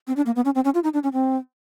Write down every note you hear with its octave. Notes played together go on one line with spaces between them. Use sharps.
C4
D4
A#3
B3
C#4
C4
C#4
F4
D#4
D4
C#4
C4